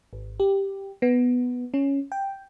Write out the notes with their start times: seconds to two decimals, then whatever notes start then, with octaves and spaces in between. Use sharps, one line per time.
0.13 G#1
0.40 G4
1.02 B3
1.74 C#4
2.12 G5